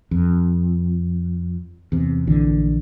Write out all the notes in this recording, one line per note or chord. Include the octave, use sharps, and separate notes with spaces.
F2
E2 C3
A#1 D3 E3